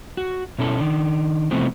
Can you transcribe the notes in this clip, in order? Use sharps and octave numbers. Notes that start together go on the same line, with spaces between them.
F#4
B2 C#4 E4 A4
D#3 D4
C3 E3 F3 A3 B3 C4